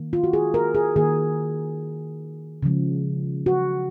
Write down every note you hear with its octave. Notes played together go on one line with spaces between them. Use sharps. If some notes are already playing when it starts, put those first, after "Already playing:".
Already playing: D#3 A#3
F4
F#4
G#4
A#4
G#4
D#3 A#3 G#4
C#3 F3 G#3
F#4